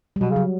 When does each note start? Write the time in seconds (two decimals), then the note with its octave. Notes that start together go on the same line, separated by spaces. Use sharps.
0.16 G3
0.21 B2 F#3
0.32 C#3 F#3